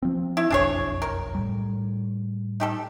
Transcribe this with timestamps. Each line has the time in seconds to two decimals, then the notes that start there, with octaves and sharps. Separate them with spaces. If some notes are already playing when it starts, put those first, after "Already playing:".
0.02 F3 C4
0.37 E4
0.50 F#1 B1 F2 D4 G#4 C#5
1.02 A#4
1.35 A2 G3
2.60 D#4 G4 A4